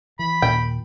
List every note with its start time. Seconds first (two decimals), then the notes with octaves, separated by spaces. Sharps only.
0.19 E3 B5
0.42 D#2 A#2 G5